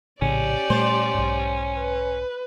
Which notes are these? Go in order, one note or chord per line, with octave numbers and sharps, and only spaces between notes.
A#1 A2 C#3 C#4 G4 D5
A#2 G3 A3 C5
B1 G#2
B4